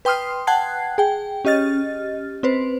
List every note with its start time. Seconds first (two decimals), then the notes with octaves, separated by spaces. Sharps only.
0.05 B4 G5 C6 D#6 F6 C7
0.47 F#5 G5 A5 F#6 G#6 C7
0.98 G#4 G5
1.45 C#4 G4 D#5 F6 A6
2.43 C4 B4 C5